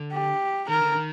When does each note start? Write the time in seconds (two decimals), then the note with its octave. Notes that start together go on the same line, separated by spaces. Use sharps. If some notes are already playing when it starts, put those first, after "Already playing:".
Already playing: D3
0.13 G4
0.68 D#3 A#4
0.82 D3
0.96 D#3